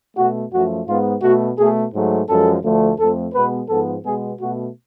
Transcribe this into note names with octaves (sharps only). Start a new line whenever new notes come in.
B2 A3 F#4
F#2 F3 A3 F#4
G#2 G#3 B3 F4
B2 A3 F#4
B2 A3 G#4
G#2 F#3 A3
F#2 F3 G#3 A4
D2 D3 F3 A3
F2 F3 A3 A4
B2 G#3 B3 B4
G#2 F3 B3 A4
B2 G#3 B3 G#4
B2 A3 F#4